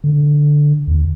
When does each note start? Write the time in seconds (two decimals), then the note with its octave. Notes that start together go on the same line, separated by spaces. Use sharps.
0.04 D3
0.87 D#2